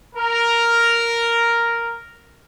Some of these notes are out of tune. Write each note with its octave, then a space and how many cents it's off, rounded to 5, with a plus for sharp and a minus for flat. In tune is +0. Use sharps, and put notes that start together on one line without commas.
A#4 +0